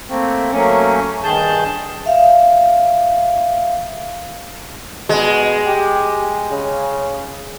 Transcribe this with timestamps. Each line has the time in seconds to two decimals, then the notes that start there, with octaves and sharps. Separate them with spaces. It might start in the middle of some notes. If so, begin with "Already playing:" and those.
0.09 A3 A#3 C4
0.52 F#3 A3 A#3 C#4
1.24 G2 D#3 G#4 A5 G6
2.06 E5 F5
5.09 B2 G#3
5.67 G4
6.51 C#3